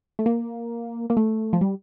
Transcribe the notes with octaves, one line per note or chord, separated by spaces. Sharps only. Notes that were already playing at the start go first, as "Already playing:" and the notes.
A3
A#3
A#3
A3
F3
G3